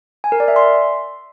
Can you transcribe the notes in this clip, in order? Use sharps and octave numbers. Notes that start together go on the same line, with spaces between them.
G#5
A#4
D5
E5
C6